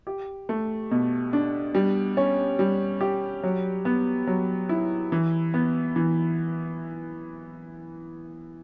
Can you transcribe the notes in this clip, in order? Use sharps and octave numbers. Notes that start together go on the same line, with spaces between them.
G4
A3
B2
D4
G3
C#4
G3
G4
F#3
B3
F#3
E4
E3
B3
E3